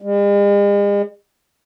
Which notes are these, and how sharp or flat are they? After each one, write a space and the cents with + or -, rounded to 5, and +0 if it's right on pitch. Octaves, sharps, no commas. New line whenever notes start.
G#3 -45